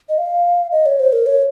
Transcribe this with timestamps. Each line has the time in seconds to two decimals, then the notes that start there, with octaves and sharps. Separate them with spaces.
0.09 D#5
0.18 F5
0.72 D#5
0.86 C#5
1.00 C5
1.13 A#4
1.26 C#5